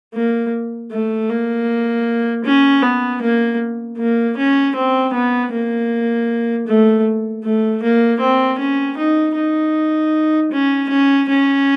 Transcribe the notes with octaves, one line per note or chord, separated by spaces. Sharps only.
A#3
A3
A#3
C#4
B3
A#3
A#3
C#4
C4
B3
A#3
A3
A3
A#3
C4
C#4
D#4
D#4
C#4
C#4
C#4